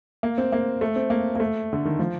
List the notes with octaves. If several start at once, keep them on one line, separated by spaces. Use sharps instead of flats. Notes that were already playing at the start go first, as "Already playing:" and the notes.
A#3
C4
A#3
A3
C4
A#3
A#3
A3
D3
D#3
F3